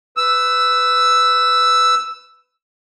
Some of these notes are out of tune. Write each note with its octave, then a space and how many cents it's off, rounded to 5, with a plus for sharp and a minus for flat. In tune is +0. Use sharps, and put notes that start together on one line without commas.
B4 +15 E6 +0